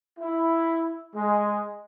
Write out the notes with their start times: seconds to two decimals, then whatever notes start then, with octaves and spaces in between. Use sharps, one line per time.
0.19 E4
1.16 G#3